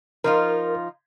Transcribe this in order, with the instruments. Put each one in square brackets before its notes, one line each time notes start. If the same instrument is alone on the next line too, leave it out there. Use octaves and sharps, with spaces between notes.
[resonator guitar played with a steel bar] F3 D#4 F4 [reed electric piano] A#4